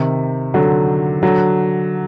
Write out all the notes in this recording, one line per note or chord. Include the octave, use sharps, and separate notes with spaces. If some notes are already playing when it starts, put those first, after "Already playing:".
Already playing: C3 D#3
D3 F#3
D3 F#3